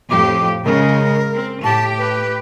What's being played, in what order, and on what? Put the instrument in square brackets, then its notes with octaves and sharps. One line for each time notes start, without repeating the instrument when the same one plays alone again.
[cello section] F2 A2 G4 [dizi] D6
[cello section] C#3 G#3 [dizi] A#4
[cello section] C4
[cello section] A2 G4 [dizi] A5
[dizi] B4